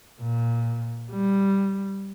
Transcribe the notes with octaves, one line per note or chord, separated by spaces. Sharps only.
A#2
G3